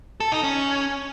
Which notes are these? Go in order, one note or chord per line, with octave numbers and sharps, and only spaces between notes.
A4
D#4
C#4